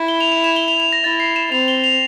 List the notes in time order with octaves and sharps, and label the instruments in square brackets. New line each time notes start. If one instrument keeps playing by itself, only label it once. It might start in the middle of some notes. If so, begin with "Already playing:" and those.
Already playing: [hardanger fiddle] E4
[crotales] G7
F7
E7
E7
G7
F7
F7
A#6
[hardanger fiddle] E4 [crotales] A6
[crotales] C7
E7
[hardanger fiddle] C4 [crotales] F7
[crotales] G7
F7